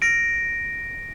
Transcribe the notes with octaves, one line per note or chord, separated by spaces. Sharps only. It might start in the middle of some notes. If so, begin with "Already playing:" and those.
A#6 D7